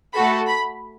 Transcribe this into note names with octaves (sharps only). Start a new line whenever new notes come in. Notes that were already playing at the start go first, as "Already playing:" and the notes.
A3 F#4 A4 B5
B5